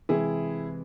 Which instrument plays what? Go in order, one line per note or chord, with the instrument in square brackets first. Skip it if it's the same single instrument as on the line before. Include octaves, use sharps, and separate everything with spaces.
[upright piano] C3 E3 G#3 E4 G#4